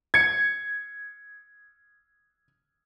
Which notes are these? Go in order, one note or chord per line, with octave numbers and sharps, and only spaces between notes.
G#6 C#7